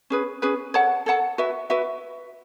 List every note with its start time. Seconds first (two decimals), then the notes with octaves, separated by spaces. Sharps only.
0.10 C#4 G#4 B4
0.42 C#4 G#4 B4
0.74 A4 C#5 F#5 A5
1.06 A4 C#5 F#5 A5
1.38 F#4 B4 E5
1.70 F#4 B4 E5